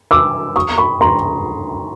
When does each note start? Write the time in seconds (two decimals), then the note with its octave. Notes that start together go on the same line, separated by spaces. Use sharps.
0.11 D6 E6
0.56 C#6 D#6
0.78 B5 C#6
1.01 A#5 C6